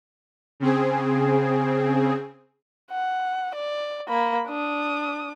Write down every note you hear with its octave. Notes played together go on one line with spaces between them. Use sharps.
C#3 C4 G#4
F#5
D5
A#3 B5
D4 D#6